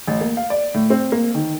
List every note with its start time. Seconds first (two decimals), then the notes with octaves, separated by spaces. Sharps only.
0.08 A1
0.21 A#3
0.37 F5
0.50 D5
0.74 A2
0.90 C4
1.12 A#3
1.35 D#3